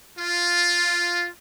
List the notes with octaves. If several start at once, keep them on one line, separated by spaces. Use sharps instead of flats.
F4